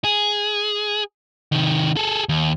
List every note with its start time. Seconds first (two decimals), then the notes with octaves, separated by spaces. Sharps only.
0.04 G#4
1.52 C3 D#3
1.96 G#4 A4
2.29 D#2